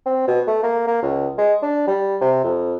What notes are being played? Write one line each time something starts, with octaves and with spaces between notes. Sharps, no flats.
C4
B2
A3
A#3
A#3
C#2
G#3
D4
G3
C3
F2